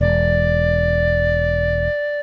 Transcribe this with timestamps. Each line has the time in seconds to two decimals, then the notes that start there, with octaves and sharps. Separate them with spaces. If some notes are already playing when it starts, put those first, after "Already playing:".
0.01 E1 D5